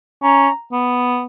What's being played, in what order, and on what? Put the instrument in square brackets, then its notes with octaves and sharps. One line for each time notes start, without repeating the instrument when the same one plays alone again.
[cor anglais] C#4 [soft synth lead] A#5
[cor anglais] B3